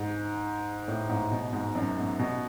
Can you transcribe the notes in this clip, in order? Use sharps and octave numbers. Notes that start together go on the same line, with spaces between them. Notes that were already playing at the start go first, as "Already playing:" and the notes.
Already playing: G#2
A2
G#2
B2
G#2
F#2
G#2
B2